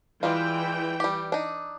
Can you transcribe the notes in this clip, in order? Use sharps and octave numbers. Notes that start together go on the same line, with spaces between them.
E3 G3 G#3 F4 G5
G3 G4
D4 D#4